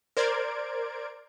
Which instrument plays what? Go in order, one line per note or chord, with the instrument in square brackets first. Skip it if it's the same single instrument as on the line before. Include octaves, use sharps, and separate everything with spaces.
[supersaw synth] A#4 C5 D5 G#6 D7